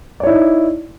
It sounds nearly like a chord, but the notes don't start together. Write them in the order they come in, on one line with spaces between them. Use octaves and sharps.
D5 C#5 E4 D#4